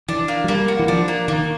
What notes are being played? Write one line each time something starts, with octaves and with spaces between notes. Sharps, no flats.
E3 D4
A#3
F#3
G3 A#3
F#4
E3
F3 D4
A#3
D#3 A#3